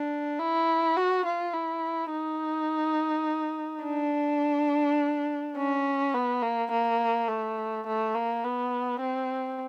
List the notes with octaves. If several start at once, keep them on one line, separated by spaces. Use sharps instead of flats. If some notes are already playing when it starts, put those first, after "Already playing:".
Already playing: D4
E4
F#4
F4
E4
D#4
D4
C#4
B3
A#3
A#3
A3
A3
A#3
B3
C4